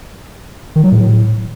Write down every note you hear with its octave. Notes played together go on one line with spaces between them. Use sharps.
D#3
F#3
A2